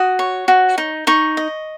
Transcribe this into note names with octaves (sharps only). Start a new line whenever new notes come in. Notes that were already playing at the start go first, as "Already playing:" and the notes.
Already playing: F#4 D#6
C#5
F#4
D#4
D#4 C#6
D#5